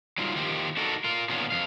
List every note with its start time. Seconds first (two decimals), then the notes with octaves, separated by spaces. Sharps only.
0.18 F#3 G3 C4 D#4 F4
0.35 D#3 F3 A#3 C4 G4
0.77 D4 D#4 F#4 A4 A#4
1.04 F4 A#4
1.29 A#2 D3 D#3 B3 C#4 F4
1.50 F2 G3 F5